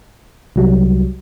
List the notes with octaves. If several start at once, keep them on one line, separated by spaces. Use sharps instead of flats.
C2 F#3 G3